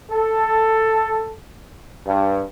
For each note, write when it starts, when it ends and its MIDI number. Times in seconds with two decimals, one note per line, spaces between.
0.10 1.31 69
2.06 2.42 43